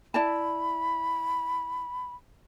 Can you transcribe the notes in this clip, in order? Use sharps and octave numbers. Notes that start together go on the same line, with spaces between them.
E4 D5 A5 B5